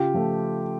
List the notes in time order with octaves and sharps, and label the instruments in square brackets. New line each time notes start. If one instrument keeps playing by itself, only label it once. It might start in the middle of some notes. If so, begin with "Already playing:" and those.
Already playing: [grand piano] C#3 F4 G4
F3 A3